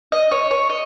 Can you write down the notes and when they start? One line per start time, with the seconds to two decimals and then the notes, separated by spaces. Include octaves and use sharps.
0.12 D#5
0.31 C#5
0.51 C#5
0.70 D#5